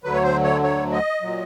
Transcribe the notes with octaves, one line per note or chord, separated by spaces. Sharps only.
D2 D3 F#3 B4
C#5
C5
C#5
C#5
D#5
A#2 F#3